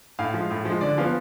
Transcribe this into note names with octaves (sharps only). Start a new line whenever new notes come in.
A2 F5
F3 G#3
A2
F3 G#3
D3 D5
F3 B3 F5